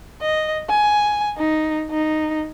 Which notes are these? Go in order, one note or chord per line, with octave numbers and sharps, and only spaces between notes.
D#5
G#5
D#4
D#4